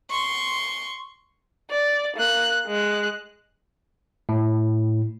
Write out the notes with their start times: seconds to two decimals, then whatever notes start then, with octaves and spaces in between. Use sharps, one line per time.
0.10 C6 C#6
1.71 D5
2.16 A#3 F#6
2.68 G#3 F#6
4.29 A2